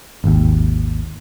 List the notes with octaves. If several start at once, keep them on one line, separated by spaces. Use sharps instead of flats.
G#1 D#2